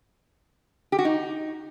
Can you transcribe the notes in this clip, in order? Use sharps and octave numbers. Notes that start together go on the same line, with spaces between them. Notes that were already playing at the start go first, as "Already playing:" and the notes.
G4
F#4
D#4